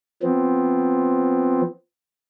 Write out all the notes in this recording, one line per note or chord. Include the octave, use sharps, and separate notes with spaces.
F3 B3 C4